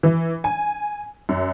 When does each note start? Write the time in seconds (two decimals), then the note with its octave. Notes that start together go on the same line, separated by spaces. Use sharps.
0.03 E3
0.44 G#5
1.29 F#2